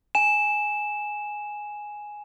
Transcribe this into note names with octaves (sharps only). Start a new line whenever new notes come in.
G#5 E7